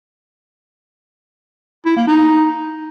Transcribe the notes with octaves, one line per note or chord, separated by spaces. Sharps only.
E4
A#3
D#4